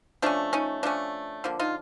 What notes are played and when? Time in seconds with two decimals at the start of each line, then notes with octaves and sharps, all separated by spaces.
0.22 F3 A3 C#4 D4
0.53 C#4 D#4
0.83 F3 A3 C#4 D4
1.44 D3 F3 A#3
1.59 D#4 F4